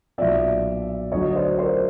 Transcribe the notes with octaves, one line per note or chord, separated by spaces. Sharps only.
B1 A#2 F3 D5 E5
D2 D3 F#3 C#5 D#5
C5 D5
A#4 C5